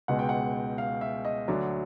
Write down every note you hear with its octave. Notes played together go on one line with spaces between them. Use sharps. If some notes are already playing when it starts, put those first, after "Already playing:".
C#2 B2 G#3 F#5
G5
F#5
F5
E5
D#5
D2 D3 F#3 D5